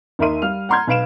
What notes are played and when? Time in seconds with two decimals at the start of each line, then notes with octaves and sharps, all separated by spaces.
0.19 D#2 D#4 A#4 E5 C6 D#7
0.42 G3 F5 F6 F7
0.69 F#5 A#5 C6 F6 G6 G#6
0.87 B1 B4 F5 D7 E7